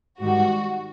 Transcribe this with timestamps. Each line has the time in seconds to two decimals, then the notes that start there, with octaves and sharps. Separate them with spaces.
0.20 G#2 D#3 G3 F#4